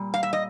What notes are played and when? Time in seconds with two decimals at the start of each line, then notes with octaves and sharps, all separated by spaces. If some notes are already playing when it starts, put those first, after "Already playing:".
Already playing: A#2 G3
0.14 F5
0.23 E5
0.33 D#5